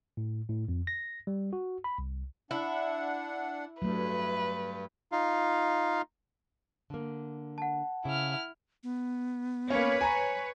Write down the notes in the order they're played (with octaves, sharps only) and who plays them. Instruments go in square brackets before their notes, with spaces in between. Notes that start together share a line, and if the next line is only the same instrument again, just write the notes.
[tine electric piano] A2
A2
F2
A#6
G3
F#4
B5
C2
[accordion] D4 F#5 [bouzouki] E4
[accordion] G2 [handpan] F#3 A3 [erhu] B4
[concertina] D#4 F4 F5
[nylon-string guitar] D3 A#3
[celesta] F#5 A5
[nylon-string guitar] C#3 [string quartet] E4 F6
[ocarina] B3
[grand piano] A#3 C#4 [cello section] B4 C#5
[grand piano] G#5 A#5